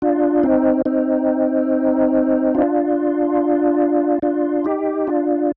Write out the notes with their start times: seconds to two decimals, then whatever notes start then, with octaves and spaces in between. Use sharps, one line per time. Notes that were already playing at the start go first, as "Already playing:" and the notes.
0.02 D4 F4
0.43 C4 D#4
0.85 C4 D#4
2.55 D4 F4
4.22 D4 F4
4.65 D#4 G4
5.07 D4 F4